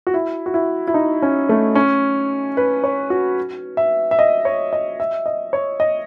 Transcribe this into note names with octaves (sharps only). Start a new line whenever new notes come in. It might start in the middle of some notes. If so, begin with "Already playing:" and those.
F#4
E4
F#4
E4
E4
D#4
C#4
A3
C#4
B4
C#5
F#4
E5
E5
D#5
C#5
D#5
E5
D#5
C#5
D#5